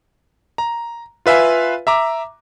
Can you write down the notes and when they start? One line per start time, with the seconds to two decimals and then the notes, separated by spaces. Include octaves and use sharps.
0.58 A#5
1.26 F4 B4 E5 F5 G#5
1.87 E5 A#5 D6